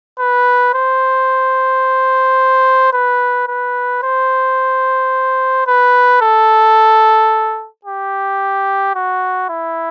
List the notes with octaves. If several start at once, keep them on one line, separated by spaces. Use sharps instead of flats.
B4
C5
B4
B4
C5
B4
A4
G4
F#4
E4